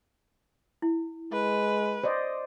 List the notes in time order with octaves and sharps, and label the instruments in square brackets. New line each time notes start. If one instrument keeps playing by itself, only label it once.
[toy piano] E4
[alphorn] G#3 [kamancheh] B4
[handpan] C5 D5 D#5